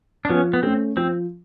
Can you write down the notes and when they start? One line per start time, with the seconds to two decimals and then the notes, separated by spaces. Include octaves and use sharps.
0.25 D4
0.29 F3 B3 C#4
0.53 B3
0.63 A3 C4 C#4
0.97 F3 C4